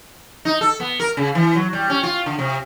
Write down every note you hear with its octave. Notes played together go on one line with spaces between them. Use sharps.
D#4
A4
B3
A#4
C#3
E3
F#3
G3
C#4
F4
D3
C3